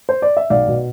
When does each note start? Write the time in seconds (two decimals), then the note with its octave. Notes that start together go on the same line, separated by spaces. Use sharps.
0.09 C5
0.22 D5
0.37 E5
0.50 B1 D5 F5
0.67 B2